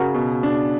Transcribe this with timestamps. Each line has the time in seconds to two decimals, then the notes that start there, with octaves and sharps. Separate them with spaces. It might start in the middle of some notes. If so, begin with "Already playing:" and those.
Already playing: C#3 F#4 A#4
0.14 B2
0.43 D4